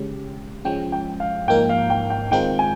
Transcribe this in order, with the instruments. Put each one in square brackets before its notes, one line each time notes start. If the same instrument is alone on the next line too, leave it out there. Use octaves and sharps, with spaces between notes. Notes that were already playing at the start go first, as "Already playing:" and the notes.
Already playing: [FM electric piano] C#3 G#3 C#4 G4
[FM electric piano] F3 G#3 C#4 [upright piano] G5
[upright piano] G5
F5
[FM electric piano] G#2 F3 A#3 D#4 A#4 [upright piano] G5
[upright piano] F5
G5
G5
[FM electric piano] D#3 G#3 C4 F4 A#4 [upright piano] G5
[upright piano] G#5